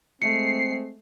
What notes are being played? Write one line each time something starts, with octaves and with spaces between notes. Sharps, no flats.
G#3 A3 C4 C7 C#7